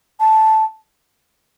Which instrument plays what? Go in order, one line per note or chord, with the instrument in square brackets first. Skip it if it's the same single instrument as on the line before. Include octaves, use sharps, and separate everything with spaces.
[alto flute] A5